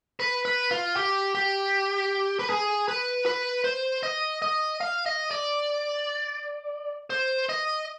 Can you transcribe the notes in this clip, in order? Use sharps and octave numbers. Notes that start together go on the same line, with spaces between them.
B4
B4
F4
G4
G4
B4
G#4
B4
B4
C5
D#5
D#5
F5
D#5
D5
C5
D#5